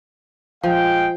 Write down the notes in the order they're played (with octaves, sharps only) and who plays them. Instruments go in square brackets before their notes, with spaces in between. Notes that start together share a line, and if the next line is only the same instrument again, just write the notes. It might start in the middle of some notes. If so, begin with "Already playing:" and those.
[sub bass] D#1 [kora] F3 [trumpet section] G#3 F5 G5